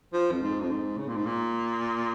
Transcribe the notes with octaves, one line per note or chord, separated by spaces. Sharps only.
F3
F2
G#2
F2
G#2
C#3
A#2
G#2
A#2